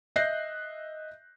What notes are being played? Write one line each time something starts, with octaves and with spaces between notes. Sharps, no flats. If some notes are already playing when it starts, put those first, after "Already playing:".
D#5 E5 F#6 G6 A#6 C7